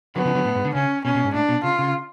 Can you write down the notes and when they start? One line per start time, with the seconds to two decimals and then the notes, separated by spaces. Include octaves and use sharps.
0.15 D3 F#3 B3
0.25 C#3 F3
0.35 D3 F#3
0.45 A2
0.55 G#2
0.65 D3
0.74 C#3 C#4
1.05 B2 C#4
1.15 B2
1.24 G#2
1.34 A2 D4
1.49 B2
1.63 C#3 F4
1.79 C#3